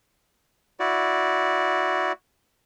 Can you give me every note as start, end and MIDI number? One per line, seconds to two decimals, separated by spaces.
0.80 2.12 64
0.80 2.12 66
0.80 2.12 74